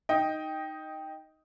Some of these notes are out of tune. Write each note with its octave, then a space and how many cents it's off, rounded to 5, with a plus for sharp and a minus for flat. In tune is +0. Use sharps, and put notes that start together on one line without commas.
D#4 +0 D#5 +10 G5 +0